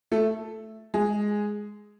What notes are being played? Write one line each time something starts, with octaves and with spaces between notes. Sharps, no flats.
A3 A4
G#3 G#4